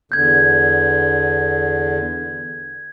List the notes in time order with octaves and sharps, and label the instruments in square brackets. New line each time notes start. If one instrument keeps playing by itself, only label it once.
[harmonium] E2 D3 [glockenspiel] G6 G#6